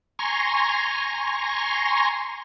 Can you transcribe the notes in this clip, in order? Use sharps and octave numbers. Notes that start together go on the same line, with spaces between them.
G#5 A#5 C6 C#6